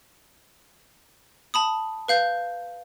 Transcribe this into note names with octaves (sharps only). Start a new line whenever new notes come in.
A5 B5 D#6
B4 F5 G6